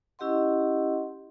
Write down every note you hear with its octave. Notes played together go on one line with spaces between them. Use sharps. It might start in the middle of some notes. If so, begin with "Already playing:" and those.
C#4 E4 G4 D#5 F#5 C6